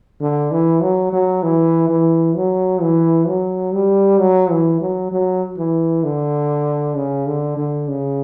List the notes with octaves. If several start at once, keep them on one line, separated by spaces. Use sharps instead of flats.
D3
E3
F#3
F#3
E3
E3
F#3
E3
F#3
G3
F#3
E3
F#3
F#3
E3
D3
C#3
D3
D3
C#3